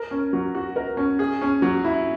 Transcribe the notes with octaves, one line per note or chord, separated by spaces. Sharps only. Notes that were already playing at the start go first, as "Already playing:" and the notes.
Already playing: A#4
C#4
F#3
F#4
A#4
C#4
G#4
C#4
F#3
E4